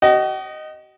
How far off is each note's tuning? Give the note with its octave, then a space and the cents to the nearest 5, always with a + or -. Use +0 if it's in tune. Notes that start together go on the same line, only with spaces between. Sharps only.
F#4 +45 D#5 -5